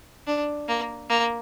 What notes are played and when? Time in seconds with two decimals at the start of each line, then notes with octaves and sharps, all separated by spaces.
0.27 D4
0.68 A#3
1.09 A#3